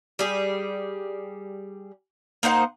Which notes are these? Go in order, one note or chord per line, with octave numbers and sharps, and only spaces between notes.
G3 G#4
A#3 D#4 C5 F#5